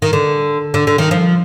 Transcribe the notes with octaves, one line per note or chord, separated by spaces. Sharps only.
D#3
D3
D3
D3
D#3
F3